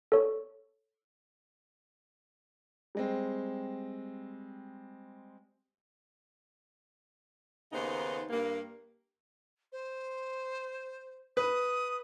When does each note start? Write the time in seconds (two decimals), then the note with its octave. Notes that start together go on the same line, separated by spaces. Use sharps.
0.12 A4 C#5
2.95 G3 G#3 C4
7.73 D#2 C#3 B3 D#4 C5
8.30 G2 A#3
9.72 C5
11.37 B4 D#6